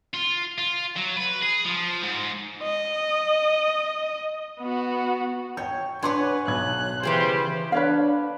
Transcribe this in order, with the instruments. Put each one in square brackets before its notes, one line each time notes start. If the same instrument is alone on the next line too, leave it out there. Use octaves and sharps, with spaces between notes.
[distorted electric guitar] F4
F4
F#3
B4
G#4
F3
G#2
[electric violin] D#5
B3 F#4
[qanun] C#5 [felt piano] G5 G6
[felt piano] D4 C6 D6 [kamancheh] B4 [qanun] C#5 F#5 G#5
[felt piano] B1 G#6 [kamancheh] F#6
[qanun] C#3 E3 D6 [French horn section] G3 G4 C5 [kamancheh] B4 C6
[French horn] D4 [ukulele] B4 C#5 F5